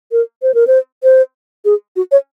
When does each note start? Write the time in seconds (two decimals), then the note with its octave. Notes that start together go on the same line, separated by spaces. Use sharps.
0.12 A#4
0.42 C5
0.54 A#4
0.67 C5
1.03 C5
1.65 G#4
1.96 F#4
2.12 C#5